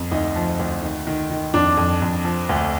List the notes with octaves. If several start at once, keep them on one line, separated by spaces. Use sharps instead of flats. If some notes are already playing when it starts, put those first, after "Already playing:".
Already playing: F2
D2 D#4
F3
D2
D#3
D#3
D#3
F2 D4
F2
F2
F3
D2